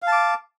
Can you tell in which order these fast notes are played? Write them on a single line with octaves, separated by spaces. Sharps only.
F5 A5 D6